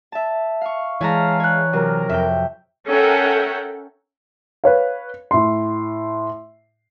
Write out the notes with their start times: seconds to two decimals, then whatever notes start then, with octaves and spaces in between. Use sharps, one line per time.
0.12 E5 A5
0.61 F5 C#6
1.01 E3 G#3 C#5 F5 A5 A#5
1.40 C#5 F#6
1.73 C3 F#3 A#4
2.09 F2 E5 G5
2.89 C#4 A4 A#4 E5 F#5 G5
4.64 B4 C#5 F5
5.31 A2 C6